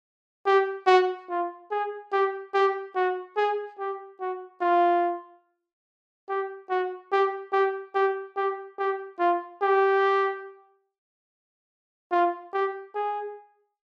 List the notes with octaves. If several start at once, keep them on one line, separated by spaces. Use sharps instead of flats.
G4
F#4
F4
G#4
G4
G4
F#4
G#4
G4
F#4
F4
G4
F#4
G4
G4
G4
G4
G4
F4
G4
F4
G4
G#4